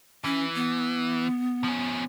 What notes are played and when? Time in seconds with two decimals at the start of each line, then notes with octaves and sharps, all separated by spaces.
0.24 E3 C#4
0.55 B3
1.64 F3 C#4